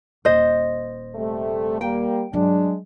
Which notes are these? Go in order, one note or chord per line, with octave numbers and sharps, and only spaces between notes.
D#1 C5 D#5
C3 G3 A3
G3 A#3 G5
G2 F#3 G#3 D4